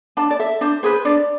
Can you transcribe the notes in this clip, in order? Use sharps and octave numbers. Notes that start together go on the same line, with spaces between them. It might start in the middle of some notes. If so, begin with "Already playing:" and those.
D4 A5
D5
A4 E5
D4 C5
G#4 B4 C5
D4 D5